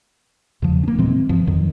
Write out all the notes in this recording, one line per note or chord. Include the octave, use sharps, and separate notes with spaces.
E2 C#3 F3
A#3 C#4
A#2 E3 G#3 C4
G2 E3 F3
F2 D#3 F#3